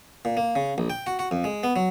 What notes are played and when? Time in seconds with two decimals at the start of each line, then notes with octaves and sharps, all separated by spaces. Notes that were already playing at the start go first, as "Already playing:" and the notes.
0.25 A#2
0.37 A#3
0.56 C#3
0.78 A#1
0.90 G5
1.07 F#4
1.19 F#4
1.31 F2
1.44 G#3
1.63 B3
1.76 F#3